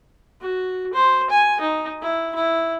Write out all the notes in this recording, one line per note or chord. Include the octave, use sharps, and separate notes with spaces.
F#4
C5
G#5
D#4
E4
E4